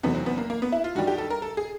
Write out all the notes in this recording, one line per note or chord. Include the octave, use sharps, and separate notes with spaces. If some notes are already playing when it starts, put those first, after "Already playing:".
E2 C3 D#3 F#3 A3 B3
C4
B3
A#3
A#3
B3
E4
F4
G2 D#3 G3 F#4
G4
A4
A#4
A4
G#4